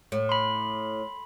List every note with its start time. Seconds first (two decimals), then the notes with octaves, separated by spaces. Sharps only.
0.12 A2
0.29 B5 C6